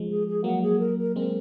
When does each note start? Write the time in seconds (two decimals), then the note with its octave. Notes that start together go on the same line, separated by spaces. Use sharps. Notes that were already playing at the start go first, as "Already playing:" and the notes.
Already playing: F3 G#3
0.10 G#4
0.27 G#4
0.44 F#3 A#3 F#5
0.62 G#4
0.80 A#4
0.98 A#4
1.16 G#3 C4 A#4